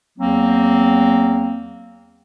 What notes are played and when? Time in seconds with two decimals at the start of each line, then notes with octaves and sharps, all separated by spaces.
0.19 E2 F#3 A#3 C4